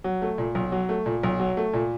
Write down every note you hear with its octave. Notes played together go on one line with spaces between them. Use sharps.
F#3
A3
A#2
B1
F#3
A3
A#2
B1
F#3
A3
A#2